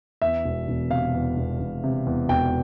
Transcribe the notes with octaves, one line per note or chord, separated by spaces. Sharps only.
E2 E5
E1
E1
C3 F5
E2
E1
E1
C3
E2
E1 G5